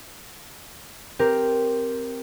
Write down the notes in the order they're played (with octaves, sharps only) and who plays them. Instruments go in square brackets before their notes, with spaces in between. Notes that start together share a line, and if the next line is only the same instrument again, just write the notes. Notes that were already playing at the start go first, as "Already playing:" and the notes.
[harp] C4 G4 A#4